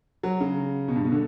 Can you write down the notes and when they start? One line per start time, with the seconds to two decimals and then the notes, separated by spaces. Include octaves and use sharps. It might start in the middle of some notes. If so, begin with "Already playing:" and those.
0.23 F#3
0.40 C#3
0.88 B2
0.96 G2
1.04 B2
1.12 D3